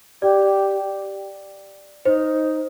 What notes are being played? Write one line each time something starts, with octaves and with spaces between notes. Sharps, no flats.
G4 D5
D#4 C5